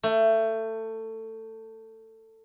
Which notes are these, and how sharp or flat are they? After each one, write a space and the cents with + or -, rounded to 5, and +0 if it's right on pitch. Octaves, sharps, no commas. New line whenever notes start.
A3 +20